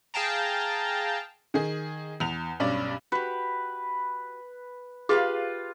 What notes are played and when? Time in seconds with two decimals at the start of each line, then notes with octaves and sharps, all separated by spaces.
0.14 G#4 F5 G5 A5 A#5
1.54 D#3 G#4
2.20 E2 F7
2.60 B1 G2 C#4 D5
3.12 F#4 G4 B4
5.09 F4 G4 G#4 B4 F5